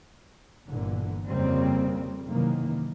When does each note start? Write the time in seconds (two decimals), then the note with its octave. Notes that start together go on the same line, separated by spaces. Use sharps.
0.68 G1 A#2 D3 E3
1.28 F2 C#3 G3 A#3 C4
2.27 F#2 C3 D#3 E3 A#3